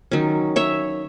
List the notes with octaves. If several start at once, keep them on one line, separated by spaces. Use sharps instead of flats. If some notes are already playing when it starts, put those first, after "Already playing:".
D#3 F#3 C#4
C#5 E5